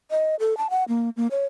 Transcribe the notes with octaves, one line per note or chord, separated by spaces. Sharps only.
D#5
A4
A5
F#5
A#3
A#3
C#5